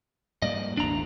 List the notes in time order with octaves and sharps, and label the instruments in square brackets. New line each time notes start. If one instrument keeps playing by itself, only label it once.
[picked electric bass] G#2 G3 A#3 [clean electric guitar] D5 D#5
[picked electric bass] E1 A1 [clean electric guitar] D4 A#5